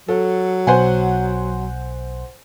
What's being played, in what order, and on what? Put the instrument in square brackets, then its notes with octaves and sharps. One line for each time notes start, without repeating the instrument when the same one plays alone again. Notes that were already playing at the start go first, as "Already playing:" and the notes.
[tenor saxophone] F#3 [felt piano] A4
[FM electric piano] B1 [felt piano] C5 F#5 G#5